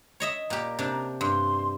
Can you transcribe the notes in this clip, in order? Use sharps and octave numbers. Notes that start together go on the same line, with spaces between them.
C#5 D#5 E5
A#2 G4 A#5
C3 D4
G2 C6